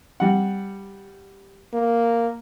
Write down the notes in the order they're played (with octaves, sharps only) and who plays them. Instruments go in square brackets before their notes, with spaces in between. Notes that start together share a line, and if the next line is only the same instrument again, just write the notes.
[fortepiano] G3 F#5
[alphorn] A#3